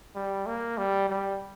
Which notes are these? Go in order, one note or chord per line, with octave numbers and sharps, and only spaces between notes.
G3
A#3
G3
G3